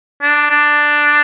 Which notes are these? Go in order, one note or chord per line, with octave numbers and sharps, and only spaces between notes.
D4
D4